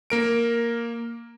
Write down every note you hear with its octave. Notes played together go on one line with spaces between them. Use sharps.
A#3 A#4 D7